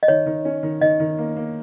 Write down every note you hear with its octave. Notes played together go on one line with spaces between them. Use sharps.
D#5
D#3 C#5
D#3
C#4
D#3
D#3 D#5
D#3
A#3
A#3